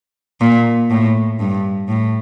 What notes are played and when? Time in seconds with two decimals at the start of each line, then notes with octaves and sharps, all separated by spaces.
0.41 A#2
0.90 A2
1.40 G2
1.88 A2